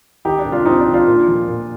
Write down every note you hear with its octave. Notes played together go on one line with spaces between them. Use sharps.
D#3 D#4 G4
D4
C3
D4 F4
C3 C4 D#4
D4
D#3
D4 F4
A#2
F3
A#2